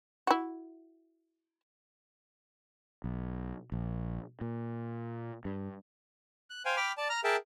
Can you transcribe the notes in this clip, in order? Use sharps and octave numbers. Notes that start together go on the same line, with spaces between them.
E4 F#4
B1
A#1
A#2
G2
F#6
C5 F5 G5 G#5
G5 B5 D6 F6
D5 A5
A#5 F6
G#4 A#4 E5 G5 A5